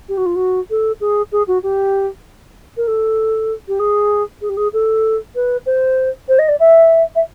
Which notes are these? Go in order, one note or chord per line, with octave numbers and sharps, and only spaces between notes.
G4
F#4
F4
F#4
A4
G#4
G#4
F#4
G4
A#4
A4
G4
G#4
G#4
G4
G#4
A4
B4
C5
C5
D#5
D5
E5
E5